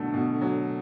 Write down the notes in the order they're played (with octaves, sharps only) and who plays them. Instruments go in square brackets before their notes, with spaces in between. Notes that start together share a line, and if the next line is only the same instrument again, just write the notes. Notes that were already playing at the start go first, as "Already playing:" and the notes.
Already playing: [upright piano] B2 F#3 A3 [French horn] D3
[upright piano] B2
F#3